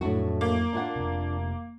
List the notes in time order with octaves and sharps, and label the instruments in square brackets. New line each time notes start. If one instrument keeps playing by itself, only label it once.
[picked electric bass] F2 F#3 [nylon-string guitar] A2 D4 F#4
[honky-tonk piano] A#3
[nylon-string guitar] D4 F4 F#5
[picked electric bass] F1 C3